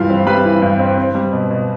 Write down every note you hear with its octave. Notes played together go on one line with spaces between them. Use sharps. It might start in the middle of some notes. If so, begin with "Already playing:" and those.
Already playing: G2 E3 G3 E4 F4 F5
C4
G3 B4 B5
E3
G2
C4
C4
G3
B2
B2